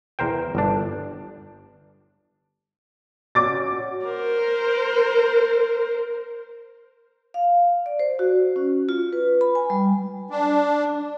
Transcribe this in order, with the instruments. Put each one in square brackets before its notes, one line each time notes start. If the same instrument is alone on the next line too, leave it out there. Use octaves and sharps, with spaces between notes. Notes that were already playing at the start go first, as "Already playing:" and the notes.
[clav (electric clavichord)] E2 A#4 C5 G5
G1 D4
[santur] C#4 F#4 [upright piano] D6 A6
[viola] A#4 C5
[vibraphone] F5
D5
C5
F#4
C#4
F4
B4
B5
G#5
G3
[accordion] D4